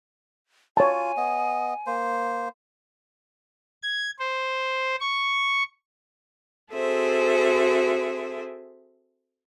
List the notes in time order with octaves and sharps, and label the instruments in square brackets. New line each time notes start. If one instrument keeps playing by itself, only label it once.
[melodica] F4 [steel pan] C#5 A5 [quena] G#5
[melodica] B3 D#5
A#3 C5
[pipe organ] G#6
C5
C#6
[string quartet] C4 F#4 G#4 A4 C5 E5